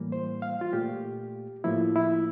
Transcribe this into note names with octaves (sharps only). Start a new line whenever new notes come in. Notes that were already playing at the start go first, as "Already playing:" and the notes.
Already playing: A2 E3 G3 A#3
C5
F5
F4
A#2 A3 G4
A2 F3 A#3 E4
E4